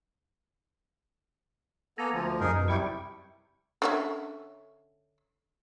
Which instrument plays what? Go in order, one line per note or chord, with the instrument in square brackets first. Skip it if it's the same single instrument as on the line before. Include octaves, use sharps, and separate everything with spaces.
[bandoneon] A#3 B3 A4 [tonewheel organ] G#5 A#5
[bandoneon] D2 F3
[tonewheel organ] F#2 [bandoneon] D#4 G#4 A#4
[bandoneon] B2
[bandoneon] C3 G3 E4 [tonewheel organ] G5 C#6
[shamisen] D3 C#4 E5